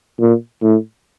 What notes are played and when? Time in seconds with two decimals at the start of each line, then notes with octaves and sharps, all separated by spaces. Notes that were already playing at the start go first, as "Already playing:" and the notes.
0.20 A#2
0.63 A2